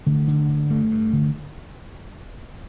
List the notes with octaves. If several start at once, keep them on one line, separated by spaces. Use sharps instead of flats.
D3 A3
D3
D3
G2 A3
G2
D3